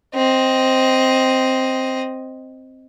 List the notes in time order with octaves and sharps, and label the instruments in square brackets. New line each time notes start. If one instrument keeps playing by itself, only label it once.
[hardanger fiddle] C4 D#5